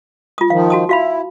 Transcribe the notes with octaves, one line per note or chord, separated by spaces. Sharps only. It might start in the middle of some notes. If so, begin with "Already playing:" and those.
F4 D#6
D#3 F3 F5
F#4 A5 D#6
E4 F#4 F5 B5